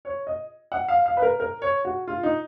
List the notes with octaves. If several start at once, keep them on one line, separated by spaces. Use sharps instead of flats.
C#5
D#5
F#5
F5
F5
B4
A#4
A#4
C#5
F#4
F4
D#4